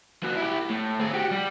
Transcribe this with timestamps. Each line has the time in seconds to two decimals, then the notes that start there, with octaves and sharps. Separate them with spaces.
0.23 A#3 F#4
0.37 E4 G4
0.70 A2
0.99 C4 G#4
1.14 F#4 G4
1.31 G3